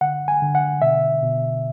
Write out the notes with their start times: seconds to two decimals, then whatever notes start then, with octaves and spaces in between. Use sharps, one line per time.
0.01 D3 F#5
0.28 G#5
0.42 D3
0.55 F#5
0.82 B2 E5
1.22 B2